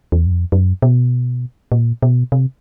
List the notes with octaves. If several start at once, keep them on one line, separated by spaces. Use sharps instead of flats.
E2
F#2
F2
F#2
B2
A#2
B2
C3